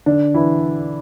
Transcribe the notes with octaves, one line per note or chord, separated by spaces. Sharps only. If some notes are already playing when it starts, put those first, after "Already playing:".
D3 D4
E3 E4